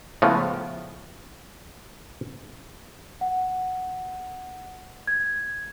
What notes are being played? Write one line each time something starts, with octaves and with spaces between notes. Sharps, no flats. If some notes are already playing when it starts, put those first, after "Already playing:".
A2 C#3 F3 G#3 B3
F#5
G#6